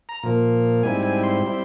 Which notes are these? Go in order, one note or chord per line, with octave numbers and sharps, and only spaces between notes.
A#5
A#2 F3 A#3
G#2 G3 C4 E4 G#5
G#5
C6
G3 C4 E4